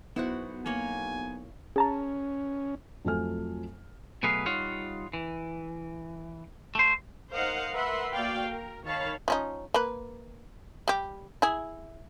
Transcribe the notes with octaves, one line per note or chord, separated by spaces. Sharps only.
B1 B3 E4 F#4 C5 F#5
A#3 C#5 G#5
C#4 G#4 A5 A#5
F2 F3 F#3 A3 G#5 F6
B2 F#3 A3 G#4 B4 F5
G3 D#4 F4 C#5 F5 F#5
E3
A3 C5
D#4 A#4 C5 D#5 F5 F#5
A#4 B4 E5 F#5 B5 C6
A#3 F#4 D5 F5 G5
A#4
D#3 C#5 F5 A5 B5
F3 C#4 D#4
A#3 B4
G3 G4
E4 G#4